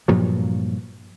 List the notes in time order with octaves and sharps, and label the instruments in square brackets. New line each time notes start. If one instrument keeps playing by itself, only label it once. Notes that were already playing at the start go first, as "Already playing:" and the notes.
[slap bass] G2 A#2 F3 F#3